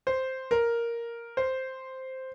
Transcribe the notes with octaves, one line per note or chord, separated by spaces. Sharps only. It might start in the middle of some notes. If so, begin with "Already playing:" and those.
C5
A#4
C5